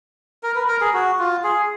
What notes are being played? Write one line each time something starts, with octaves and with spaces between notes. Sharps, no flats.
A#4
B4
A#4
G#4
F#4
F4
G#4